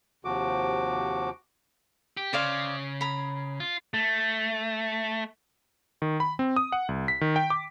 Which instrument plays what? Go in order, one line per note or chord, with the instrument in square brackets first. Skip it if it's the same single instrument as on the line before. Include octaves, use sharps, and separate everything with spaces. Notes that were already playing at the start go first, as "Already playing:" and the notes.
[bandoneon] D#2 C3 F3 F#4 D6
[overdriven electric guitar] G4
[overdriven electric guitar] C#3 [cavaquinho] C5 D5 F5
[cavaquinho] A#5 B5
[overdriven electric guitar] F4
[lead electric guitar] A3
[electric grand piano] D#3
B5
C4
D#6
F#5
C2
B6
D#3
G5
D6